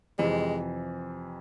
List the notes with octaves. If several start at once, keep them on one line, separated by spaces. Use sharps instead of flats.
F2 C3 E3 G#3